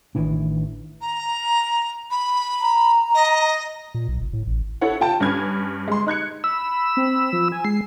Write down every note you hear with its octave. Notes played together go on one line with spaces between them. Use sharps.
A1 D#3 E3 D4
A#5
B5
A#5
D#5
A#2
B1
F#1
A2
A1
E4 A4 C#5 F#5
F4 G5 A5
G2 C#4 B4 F6 G#6
G#3 C6
D#4 F#6 G#6 C#7
B5 E6
C4
F3
G#5
G#3 C7